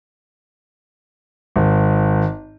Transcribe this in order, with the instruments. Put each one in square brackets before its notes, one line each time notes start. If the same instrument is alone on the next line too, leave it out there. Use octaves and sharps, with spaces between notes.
[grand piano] G#1